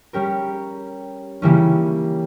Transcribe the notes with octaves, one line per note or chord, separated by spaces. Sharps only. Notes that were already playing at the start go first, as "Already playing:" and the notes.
G3 C#4 G4 A#4
C#3 E3 G3 A#3 C#4